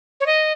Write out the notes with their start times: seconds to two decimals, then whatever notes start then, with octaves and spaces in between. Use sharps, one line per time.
0.21 C#5
0.26 D#5